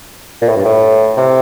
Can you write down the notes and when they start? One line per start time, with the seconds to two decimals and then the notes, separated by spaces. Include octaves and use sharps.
0.42 A#2
0.49 A2
0.57 G2
0.65 A2
1.17 C3